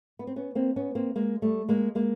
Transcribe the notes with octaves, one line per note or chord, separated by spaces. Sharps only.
B3
C4
B3 C#4
A#3 C4
B3 C#4
A#3 C4
G#3 A#3
G3 A3
G#3 A#3
G#3 A#3